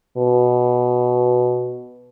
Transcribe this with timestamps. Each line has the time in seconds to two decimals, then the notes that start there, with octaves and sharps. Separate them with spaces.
0.17 B2